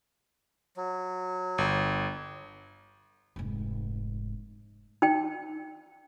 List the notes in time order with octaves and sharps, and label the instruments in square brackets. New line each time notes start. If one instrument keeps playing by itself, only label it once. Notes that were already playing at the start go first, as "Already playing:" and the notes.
[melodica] F#3
[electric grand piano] G1
[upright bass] F1 G#2
[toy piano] D#4 G5